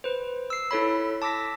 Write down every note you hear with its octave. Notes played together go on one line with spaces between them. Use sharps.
B4 C5
E6 C7
E4 A4 C#5 B5
A5 D6 E6 A#6 B6